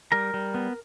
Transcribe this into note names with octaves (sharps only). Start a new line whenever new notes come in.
G3 A#4 A#5
G3
B3